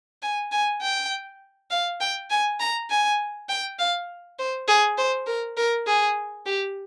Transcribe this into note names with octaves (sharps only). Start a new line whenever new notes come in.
G#5
G#5
G5
F5
G5
G#5
A#5
G#5
G5
F5
C5
G#4
C5
A#4
A#4
G#4
G4